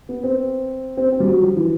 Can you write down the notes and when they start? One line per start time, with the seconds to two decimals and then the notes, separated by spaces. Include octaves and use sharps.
0.09 B3
0.24 C4
0.97 C4
1.12 C4
1.20 G3
1.27 F#3
1.42 F3
1.57 E3